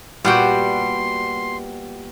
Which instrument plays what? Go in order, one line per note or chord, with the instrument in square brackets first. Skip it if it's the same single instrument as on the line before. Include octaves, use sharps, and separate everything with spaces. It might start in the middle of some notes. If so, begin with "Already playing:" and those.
[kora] A#2 G4 [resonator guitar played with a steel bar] G3 F#4 [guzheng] B3 F#5 G5 [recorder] C6